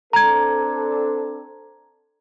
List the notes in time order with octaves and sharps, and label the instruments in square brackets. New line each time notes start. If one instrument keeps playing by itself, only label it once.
[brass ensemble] C4 D4 A4 [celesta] A#5 G#6